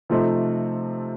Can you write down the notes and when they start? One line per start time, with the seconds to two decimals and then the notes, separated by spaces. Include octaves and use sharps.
0.10 C3 F3 A3 C4 D#4